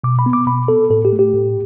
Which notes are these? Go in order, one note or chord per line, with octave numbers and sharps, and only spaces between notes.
B2 D6
B5
B3
D6
B2 B5
B3 A4
A2 A4
G4
A3
G4
A2